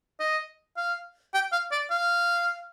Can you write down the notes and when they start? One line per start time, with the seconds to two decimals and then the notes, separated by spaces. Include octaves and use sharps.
0.20 D#5
0.77 F5
1.34 G5
1.52 F5
1.72 D5
1.91 F5